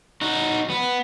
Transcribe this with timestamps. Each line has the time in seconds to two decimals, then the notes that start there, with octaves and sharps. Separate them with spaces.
0.21 D#4 F#4
0.70 B3